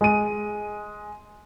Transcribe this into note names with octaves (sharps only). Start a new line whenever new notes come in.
G#3 D#7